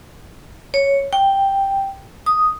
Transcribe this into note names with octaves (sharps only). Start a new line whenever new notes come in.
C#5
G5
D#6